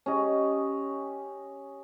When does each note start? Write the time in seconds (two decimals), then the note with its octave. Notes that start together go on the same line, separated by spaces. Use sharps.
0.06 C#4 G4 D#5